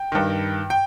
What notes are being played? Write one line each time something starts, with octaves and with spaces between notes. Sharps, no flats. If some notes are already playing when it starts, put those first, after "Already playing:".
Already playing: G5
G2 D#3
G5